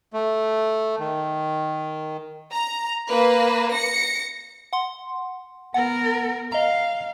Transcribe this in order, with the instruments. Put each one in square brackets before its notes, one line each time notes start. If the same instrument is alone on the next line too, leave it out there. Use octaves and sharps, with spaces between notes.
[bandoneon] A3
D#3
[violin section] A#5
A#3 B4
A#6 C#7
[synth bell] F#5 C6
[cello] B3 A#4 [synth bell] F#5
[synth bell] D#5 A#5 [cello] F5